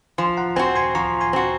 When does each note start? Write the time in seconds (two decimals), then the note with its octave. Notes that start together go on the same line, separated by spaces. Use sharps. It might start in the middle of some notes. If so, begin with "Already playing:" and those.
0.18 F3 G#5 C6
0.37 F#5 A#5
0.56 C4 F#4 G#5 C6
0.75 G#5 C6
0.95 F3 A#5 C#6
1.21 G#5 C6
1.33 C4 F#4